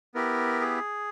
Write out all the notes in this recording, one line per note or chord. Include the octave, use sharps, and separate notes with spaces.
B3 E4 G4 A#4
G#4